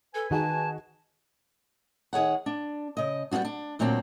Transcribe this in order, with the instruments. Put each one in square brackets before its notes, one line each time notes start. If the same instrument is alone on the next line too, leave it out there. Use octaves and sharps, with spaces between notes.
[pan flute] A4 [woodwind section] B4 G#5
[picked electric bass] D#3 [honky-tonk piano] D#4 F#4 G#4 [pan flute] A5
[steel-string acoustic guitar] D#3 G#4 C#5 F#5
D4
C#3 D#5
G3 B3 C#4 F4 F#4
D4
D2 A#2 F#3 C4 D4